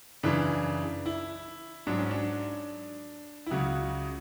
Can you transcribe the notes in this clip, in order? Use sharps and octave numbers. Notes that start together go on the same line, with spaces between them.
F#2 C#3 E3 D4
E4
G#2 F#3 D4
C#4
D4
E4
C#2 C#3 F#3 F#4